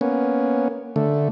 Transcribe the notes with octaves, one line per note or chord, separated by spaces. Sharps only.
A#3 B3 C#4
D3 A3